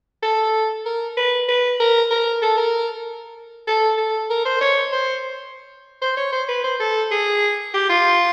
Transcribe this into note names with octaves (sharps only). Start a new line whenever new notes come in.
A4
A#4
B4
B4
A#4
A#4
A4
A#4
A4
A4
A#4
C5
C#5
C5
C5
C#5
C5
B4
C5
A4
G#4
G4
F4